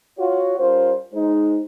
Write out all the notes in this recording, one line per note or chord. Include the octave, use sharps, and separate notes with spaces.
F4 F#4 C#5
G3 C#4 F4 A#4 C5
G#3 D#4 C5